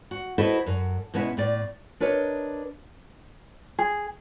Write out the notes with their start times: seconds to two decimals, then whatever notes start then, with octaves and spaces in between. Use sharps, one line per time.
0.11 F#4
0.38 E4 F#4 A4 B4 C5 D#5
0.66 F#2
1.14 B2 G#3 B3 C#4 E4 E5
1.37 A2 D5
2.00 D4 A#4 B4 C#5 D#5
3.79 G#4